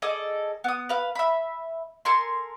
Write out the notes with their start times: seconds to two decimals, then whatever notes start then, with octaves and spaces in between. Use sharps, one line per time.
0.02 G#4 A4 D5 D#5
0.64 B3 D#6
0.89 B4 F5
1.15 E5 B5
2.05 A4 A#4 G#5 C6